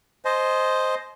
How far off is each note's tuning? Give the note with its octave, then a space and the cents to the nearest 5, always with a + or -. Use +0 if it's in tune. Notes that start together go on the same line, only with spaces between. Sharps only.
C5 +0 D#5 +0 G#5 +40